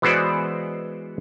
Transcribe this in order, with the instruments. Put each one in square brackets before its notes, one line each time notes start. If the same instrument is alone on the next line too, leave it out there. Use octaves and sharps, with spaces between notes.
[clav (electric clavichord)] E3 G#3 B3 F#4 C5 D5